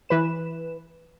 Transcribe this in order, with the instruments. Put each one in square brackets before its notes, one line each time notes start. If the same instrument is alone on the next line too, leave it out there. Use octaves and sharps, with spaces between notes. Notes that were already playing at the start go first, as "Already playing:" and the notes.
[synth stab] E3 B4 E7